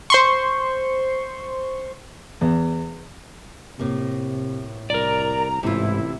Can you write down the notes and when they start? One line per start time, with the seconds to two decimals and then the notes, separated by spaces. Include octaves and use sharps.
0.10 C5 C6 C#6
2.41 E2
3.79 A2 C3 A#3
4.90 C2 A#4 D5 A#5
5.63 A1 G#2 C3 E4 F4